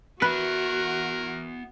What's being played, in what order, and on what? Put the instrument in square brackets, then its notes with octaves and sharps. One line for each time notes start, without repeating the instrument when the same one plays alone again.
[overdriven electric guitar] B3 E5 [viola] F#4 F#5 [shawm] A#4 [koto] B4